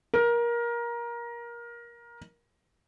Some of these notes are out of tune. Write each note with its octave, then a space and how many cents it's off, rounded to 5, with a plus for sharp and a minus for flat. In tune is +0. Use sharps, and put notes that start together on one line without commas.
A#4 +20